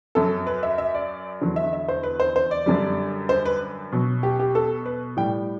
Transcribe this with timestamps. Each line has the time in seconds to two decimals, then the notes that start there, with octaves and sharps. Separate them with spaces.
0.15 F#2 F#3 A4
0.47 B4
0.63 E5
0.78 E5
0.95 D5
1.41 E2 D3 F#3
1.56 E5
1.73 E5
1.88 C5
2.03 B4
2.20 C5
2.36 C5
2.51 D5
2.66 F#2 D3 G3
3.29 C5
3.45 B4
3.92 B2 F#3
4.23 G4
4.39 G4
4.55 A4
4.86 B4
5.17 A2 G3 G5